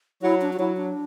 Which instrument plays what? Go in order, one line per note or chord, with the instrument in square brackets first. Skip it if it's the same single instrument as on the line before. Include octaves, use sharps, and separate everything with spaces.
[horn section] F#3 [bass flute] E4
[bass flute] D4
F#4
[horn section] F#3 [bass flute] E4
[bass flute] D4